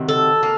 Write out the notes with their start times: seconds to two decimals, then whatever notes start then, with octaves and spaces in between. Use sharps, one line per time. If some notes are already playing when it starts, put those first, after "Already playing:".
Already playing: C3 D#3 F#3
0.09 A4
0.43 A#3